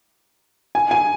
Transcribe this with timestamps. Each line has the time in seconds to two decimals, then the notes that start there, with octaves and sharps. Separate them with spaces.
0.75 G#5
0.91 G#5